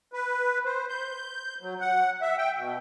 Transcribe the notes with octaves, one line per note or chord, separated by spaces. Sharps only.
B4
C5
G6
F#3
F#5
E5
G5
B2